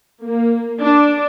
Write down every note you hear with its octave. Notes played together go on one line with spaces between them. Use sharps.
A#3
D4